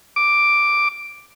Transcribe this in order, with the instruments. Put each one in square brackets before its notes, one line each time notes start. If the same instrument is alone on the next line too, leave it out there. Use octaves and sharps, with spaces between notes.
[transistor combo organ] D6